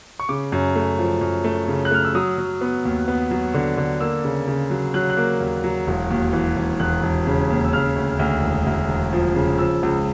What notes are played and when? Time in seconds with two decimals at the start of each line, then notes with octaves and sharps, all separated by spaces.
0.20 C#6
0.29 C#3 D6
0.52 F#2
0.76 A3
0.99 F3
1.21 F#2
1.45 A3
1.68 C#3
1.85 F#6
1.91 A3 F6
2.05 E6
2.15 F#3 D#6
2.38 F#3
2.61 B3
2.85 D#2
3.08 B3
3.31 F#3
3.54 D3
3.77 D3
4.00 A#3 E6
4.24 C#3
4.47 C#3
4.70 F#3
4.94 F#3 F#6
5.10 F#6
5.17 A#3
5.40 D#2
5.64 F#3
5.87 E1
6.10 D#2
6.33 E3
6.56 E1
6.80 E1 F#6
7.03 E1
7.27 C#3
7.50 D#2
7.65 E6
7.73 C#3 F6
7.96 D2
8.19 D2
8.43 E1
8.66 D2
8.89 E1
9.13 F3
9.35 C#3
9.59 F3 E6
9.83 C#2